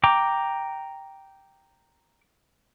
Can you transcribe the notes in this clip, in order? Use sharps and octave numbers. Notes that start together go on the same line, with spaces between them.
G5 A#5 D6